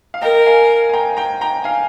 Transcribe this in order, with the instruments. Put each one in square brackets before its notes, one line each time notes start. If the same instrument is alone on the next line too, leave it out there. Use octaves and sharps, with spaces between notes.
[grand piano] F5
[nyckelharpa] A#4 [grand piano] D#5 G5
[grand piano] F5 G#5
G#5
G5 A#5
G5 A#5
G5 A#5
F5 G#5